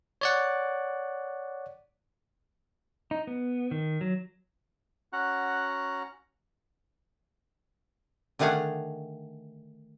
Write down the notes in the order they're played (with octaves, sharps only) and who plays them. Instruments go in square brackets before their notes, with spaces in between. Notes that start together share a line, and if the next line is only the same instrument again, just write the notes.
[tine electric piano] C#5 D5 F#5
[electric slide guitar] D#4
B3
D#3
F#3
[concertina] C#4 F#4 F#5 A#5 F#6
[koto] D3 D#3 A3 G#4 F5 F#5